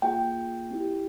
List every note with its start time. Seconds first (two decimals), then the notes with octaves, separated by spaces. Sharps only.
0.02 A#3 F4 G#4 G5
0.70 C4 E4 G4